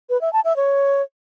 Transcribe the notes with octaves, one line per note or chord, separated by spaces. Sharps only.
B4
E5
A5
E5
C#5